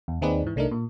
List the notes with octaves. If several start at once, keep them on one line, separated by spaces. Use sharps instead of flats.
E2
D#2 C4 D#4 G#4 B4 D5
G#2 E3
C2 A3 D4 D#4 A#4
A#2